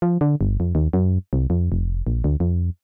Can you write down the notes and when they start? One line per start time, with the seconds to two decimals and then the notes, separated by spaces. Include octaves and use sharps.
0.02 F3
0.21 D3
0.41 G1
0.60 F2
0.75 D#2
0.93 F#2
1.33 C2
1.50 F2
1.72 F1
2.07 A#1
2.24 D2
2.40 F2